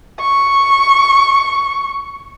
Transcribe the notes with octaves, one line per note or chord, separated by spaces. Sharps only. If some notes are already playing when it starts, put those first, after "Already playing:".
C#6